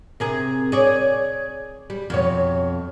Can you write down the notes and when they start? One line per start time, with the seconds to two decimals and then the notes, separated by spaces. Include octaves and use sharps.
0.20 C3 G#4 A#4
0.72 G#4 C#5 D5
1.90 G3
2.10 F2 B2 C#5